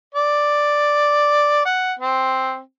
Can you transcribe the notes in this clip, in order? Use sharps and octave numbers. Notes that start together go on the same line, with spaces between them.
D5
F#5
C4